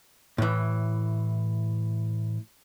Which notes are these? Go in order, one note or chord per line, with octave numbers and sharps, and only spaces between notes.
A2 E3